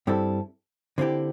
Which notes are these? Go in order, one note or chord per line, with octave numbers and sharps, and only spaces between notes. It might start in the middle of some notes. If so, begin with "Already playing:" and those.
G2 G3 C4 E4 A4
D3 C4 E4 G4